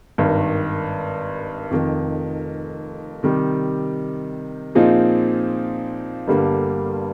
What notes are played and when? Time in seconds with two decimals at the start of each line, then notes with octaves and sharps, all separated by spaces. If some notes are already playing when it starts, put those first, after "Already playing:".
0.18 G#1 G2 D#3
1.71 F1 F2 D#3
3.23 C3 D#3 G3
4.75 A#2 F3 C4 D#4 G#4
6.27 G1 G2 D3 G3 A#3